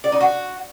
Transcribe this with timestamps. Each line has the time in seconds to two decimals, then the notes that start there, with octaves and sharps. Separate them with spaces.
0.04 D5
0.12 D#4
0.21 F#4